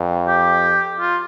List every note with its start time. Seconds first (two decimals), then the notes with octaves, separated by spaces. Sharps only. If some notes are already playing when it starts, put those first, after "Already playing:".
Already playing: F2
0.28 G4
1.00 F4